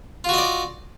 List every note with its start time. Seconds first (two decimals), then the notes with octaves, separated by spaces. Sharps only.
0.24 F4
0.29 F#4
0.34 D#5
0.38 D5